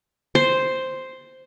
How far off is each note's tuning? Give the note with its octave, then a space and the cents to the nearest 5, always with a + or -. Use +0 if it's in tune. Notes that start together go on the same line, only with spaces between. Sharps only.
C5 +0